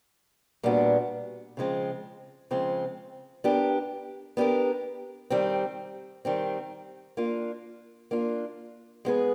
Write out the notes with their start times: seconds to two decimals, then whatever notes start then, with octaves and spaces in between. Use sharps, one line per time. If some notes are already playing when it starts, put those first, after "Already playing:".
0.63 A#2 G3 B3 D4 F#4
1.57 C#3 F3 G#3 C4
2.51 C#3 F3 G#3 C4
3.44 B3 D4 G4 A#4
4.37 B3 D4 G4 A#4
5.30 D#3 G3 C4
6.25 D#3 G3 C4
7.17 A#3 D4 F4
8.11 A#3 D4 F4
9.05 G#3 B3 E4 G#4 B4